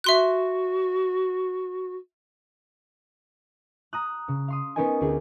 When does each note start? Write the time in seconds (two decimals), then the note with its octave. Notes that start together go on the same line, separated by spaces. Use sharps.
0.04 F#4 E5 C6 F#6
3.93 A#5 D#6 F#6
4.28 C#3
4.48 F5 C6 D#6
4.76 B3 C#4 D#4 A#4 D#5 G#5
5.01 D2 F4 G#4